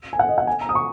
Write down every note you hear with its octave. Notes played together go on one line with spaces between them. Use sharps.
G#5
F#5
D#5
F#5
G#5
A#5
D#6
C#6